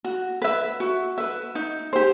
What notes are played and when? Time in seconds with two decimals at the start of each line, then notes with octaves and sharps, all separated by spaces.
0.05 F#4
0.42 B4 E5
0.80 F#4
1.18 B4 E5
1.55 D#4
1.93 G4 C5